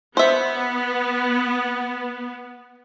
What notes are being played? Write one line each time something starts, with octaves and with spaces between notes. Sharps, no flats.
B3 C5 E5